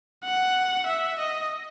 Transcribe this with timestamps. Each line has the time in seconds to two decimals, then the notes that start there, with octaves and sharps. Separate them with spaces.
0.24 F#5
0.87 E5
1.19 D#5